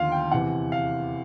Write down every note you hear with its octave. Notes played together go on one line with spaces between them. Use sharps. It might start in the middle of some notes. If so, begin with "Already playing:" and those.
Already playing: D#2 D3 F3 F5 C6
G5
E2 C3 E3 F#5
F5